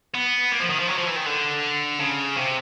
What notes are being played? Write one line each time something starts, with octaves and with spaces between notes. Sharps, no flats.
B3
A#3
F3
D#3
F3
F#3
F3
E3
D#3
D3
C#3
C3